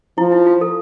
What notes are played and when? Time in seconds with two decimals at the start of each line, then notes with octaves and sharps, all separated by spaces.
0.18 F3 E4
0.32 E4
0.47 F4
0.61 A4